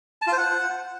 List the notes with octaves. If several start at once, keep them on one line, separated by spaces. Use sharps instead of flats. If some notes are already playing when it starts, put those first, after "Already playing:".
A5
F4
C5
F#5